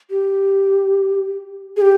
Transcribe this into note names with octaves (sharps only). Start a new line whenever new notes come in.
G4
G#4
G4